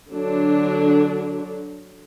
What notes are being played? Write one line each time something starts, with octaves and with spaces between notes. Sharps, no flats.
D3 F#3 D4